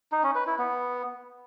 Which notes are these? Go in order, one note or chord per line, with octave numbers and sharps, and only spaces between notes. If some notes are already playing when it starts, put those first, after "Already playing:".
D#4
C#4
B4
E4
B3